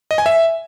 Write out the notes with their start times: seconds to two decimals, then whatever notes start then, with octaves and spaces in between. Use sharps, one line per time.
0.11 D#5
0.18 G#5
0.26 E5